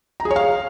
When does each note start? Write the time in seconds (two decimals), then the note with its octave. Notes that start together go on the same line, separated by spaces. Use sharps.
0.20 A#5
0.25 G#4
0.31 C#5
0.36 F5